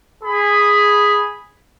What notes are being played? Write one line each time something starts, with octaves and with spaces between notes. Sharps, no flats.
G#4 B5